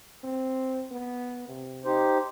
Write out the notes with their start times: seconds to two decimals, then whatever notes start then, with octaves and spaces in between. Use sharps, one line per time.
0.24 C4
0.91 B3
1.48 C3
1.85 D#4 G4 C5